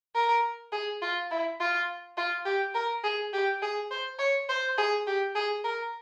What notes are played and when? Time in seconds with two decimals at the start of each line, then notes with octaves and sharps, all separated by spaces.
0.15 A#4
0.72 G#4
1.02 F4
1.31 E4
1.60 F4
2.17 F4
2.45 G4
2.75 A#4
3.04 G#4
3.33 G4
3.62 G#4
3.91 C5
4.19 C#5
4.49 C5
4.78 G#4
5.07 G4
5.35 G#4
5.64 A#4